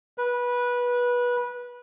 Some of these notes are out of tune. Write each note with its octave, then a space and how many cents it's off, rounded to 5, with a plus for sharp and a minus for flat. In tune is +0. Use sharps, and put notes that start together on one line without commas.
B4 -20